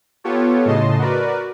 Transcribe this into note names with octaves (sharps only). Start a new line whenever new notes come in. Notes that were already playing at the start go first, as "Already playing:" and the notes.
B3 F4 G4 A4 C#5
A2 C#3 D#5 A5 C6
F#4 A#4 B4 D5